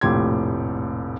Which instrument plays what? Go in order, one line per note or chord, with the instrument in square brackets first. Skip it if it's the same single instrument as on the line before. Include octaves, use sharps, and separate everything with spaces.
[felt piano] F1 A#1 A2 G4 C6 G#6